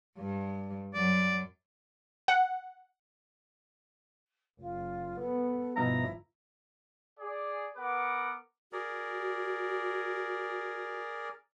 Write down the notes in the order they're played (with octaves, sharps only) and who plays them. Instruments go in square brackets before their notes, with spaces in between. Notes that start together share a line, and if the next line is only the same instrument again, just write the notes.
[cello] G2
[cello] F#2 F#3 [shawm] D5
[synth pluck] F#5
[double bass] F#1 [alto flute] F4
[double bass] B3 [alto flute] A4
[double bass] G1 F3 [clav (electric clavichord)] B2 D#4 E5 [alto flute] E4 [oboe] A#5
[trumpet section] G#4 D5
B3 A#4 B4 F#5 D6
[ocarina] F#4 [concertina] G#4 A#4 D5